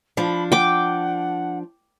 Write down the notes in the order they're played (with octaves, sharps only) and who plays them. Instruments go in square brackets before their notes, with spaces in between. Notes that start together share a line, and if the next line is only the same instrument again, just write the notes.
[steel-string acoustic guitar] F3 D4 [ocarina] B5
[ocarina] F#5 [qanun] G5 D6